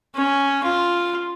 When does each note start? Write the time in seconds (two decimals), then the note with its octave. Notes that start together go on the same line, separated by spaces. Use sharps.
0.15 C#4
0.63 F4